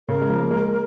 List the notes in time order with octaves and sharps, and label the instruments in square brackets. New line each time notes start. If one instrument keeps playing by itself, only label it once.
[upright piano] C#3 [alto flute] A#4
[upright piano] G#3
F3
A#3
G#3